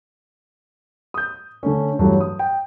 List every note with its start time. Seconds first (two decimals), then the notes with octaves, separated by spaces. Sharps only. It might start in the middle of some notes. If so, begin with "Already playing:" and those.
1.14 D#6 G6
1.63 D3 A3 C#4
1.99 G2 E3 F#3 A3
2.21 D#6
2.39 G5